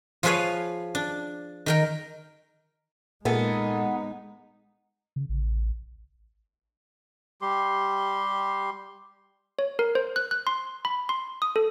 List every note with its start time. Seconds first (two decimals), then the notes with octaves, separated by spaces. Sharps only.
0.23 F3 F4 G#4 B4 C#5 F5
0.95 D4
1.66 D#3 A#4 G5
3.25 A#2 G#3 A#3 B3 D#4 G#4 A4
5.16 C#3
5.29 A1
7.41 G3 G4 C6
9.59 C#5
9.79 A#4
9.95 C5
10.16 F#6
10.31 F#6
10.47 C6
10.85 B5
11.09 C6
11.42 D#6
11.56 A4